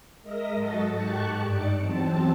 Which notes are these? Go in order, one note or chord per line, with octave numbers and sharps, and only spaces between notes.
G#3 A#4 D#5 E5 A#6
G#2 F#3 F#4 A4 D#5 A5
G#2 G4 A5 C#6 F#6
G2 D#4 D5 D6 C#7
E2 F#3 C4 A5